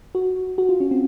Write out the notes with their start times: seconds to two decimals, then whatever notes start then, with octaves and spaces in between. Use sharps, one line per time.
0.15 F#4
0.58 F#4
0.69 F4
0.80 C#4
0.91 C4